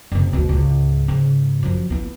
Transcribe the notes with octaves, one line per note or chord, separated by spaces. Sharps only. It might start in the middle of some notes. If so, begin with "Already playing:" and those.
F#1 C3
D2 B2
C#2 G#2
G#2 C#3
F#2 F3
B3 E4